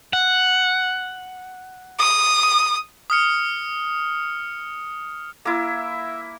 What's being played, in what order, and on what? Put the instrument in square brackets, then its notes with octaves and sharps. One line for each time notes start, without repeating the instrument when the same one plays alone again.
[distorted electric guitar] F#5
[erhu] D#6
[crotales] D#6 F6 C#7
[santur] A#3 E4 [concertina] E5